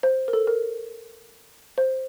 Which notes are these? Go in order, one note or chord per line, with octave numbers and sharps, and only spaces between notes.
C5
A#4
A4
A#4
C5